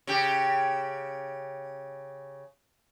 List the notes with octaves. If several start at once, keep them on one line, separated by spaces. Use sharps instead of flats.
C#3 G4